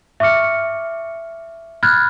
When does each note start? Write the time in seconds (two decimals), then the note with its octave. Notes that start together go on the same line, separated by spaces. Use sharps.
0.20 E5 C#6 D6 F6 C#7
1.83 B5 F6 F#6 G#6 A6